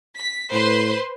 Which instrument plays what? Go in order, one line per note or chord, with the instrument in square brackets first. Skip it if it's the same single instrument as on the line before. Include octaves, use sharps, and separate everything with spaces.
[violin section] B6
[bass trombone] A2 [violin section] B4 C5 C6